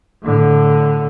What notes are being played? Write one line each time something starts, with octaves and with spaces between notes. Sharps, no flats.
A2 D3